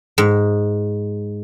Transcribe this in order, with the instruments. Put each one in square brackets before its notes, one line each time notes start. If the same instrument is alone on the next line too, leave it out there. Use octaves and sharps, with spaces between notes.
[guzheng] G#2